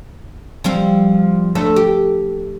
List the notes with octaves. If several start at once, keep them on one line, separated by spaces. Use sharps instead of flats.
F3 G3 C4
D2 A3 A4
G4